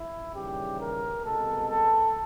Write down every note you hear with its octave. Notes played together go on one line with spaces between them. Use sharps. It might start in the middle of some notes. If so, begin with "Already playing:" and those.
Already playing: E4
D#2 C#3 E3 G3 G4
A#4
C2 B2 G#3 B3 A4
A4